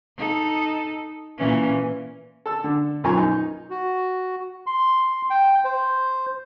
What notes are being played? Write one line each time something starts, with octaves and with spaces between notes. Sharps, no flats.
D#4 A4
A#2 E3 C#4
A4 A5 E6
D3
B1 F#2 F3 G#5 A#5 C#6
D#4
F#4
C6
G5
C5